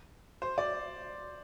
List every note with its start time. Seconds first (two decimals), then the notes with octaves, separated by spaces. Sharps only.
0.42 C5
0.58 D5